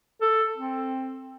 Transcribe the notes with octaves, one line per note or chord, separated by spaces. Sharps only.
A4
C4